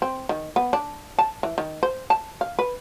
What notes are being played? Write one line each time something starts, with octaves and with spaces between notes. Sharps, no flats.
C4
D#3
B3
D4
A5
E3
D#3
C5
A5
F5
B4